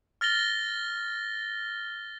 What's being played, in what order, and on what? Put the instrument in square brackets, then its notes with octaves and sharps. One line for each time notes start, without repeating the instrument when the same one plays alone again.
[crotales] F6 A6 A#6 G7